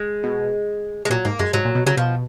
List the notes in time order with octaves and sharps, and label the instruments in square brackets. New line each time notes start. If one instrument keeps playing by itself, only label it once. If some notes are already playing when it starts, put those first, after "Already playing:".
Already playing: [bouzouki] G#3
[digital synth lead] B2
[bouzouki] G#3
[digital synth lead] A#2 [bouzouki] F#3
[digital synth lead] G#2 [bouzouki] A#3
[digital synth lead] F#2 [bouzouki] G#3
[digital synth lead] G#2 [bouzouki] F#3
[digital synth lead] A#2
B2
[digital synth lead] C#3 [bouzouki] F#3
[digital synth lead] B2 [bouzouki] F3